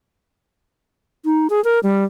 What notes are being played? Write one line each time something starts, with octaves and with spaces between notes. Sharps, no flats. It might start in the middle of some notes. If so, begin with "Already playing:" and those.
D#4
G#4
A#4
G3